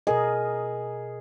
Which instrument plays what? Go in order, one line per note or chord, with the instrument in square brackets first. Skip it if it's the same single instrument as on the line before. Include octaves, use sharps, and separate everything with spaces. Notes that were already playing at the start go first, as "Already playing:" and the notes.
[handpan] B2 A#4 D#5 [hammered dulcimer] G#4